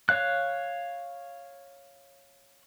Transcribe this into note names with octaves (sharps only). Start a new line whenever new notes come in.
C#5 F5 F#6